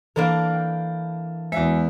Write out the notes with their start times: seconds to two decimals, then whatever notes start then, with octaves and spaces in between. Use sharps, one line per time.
0.16 E3 A#3 D4 A4 A#4
0.52 G5
1.52 E2 G#3 F#4 E5